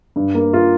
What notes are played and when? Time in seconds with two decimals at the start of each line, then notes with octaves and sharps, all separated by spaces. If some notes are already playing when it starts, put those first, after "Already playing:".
0.16 G2
0.35 A#3
0.53 F4